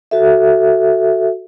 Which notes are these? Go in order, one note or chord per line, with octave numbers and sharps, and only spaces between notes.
F#4 A4 E5